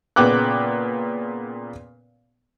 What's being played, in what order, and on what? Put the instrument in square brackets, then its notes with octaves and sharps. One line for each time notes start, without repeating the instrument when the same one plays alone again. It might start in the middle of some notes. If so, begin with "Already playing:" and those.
[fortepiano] A#2 C#3 B3 G5 D6 F#6